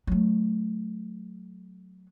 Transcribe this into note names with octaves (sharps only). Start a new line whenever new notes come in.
F#3 A3